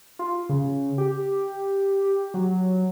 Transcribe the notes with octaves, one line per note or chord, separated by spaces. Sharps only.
F4
C#3
G4
F#3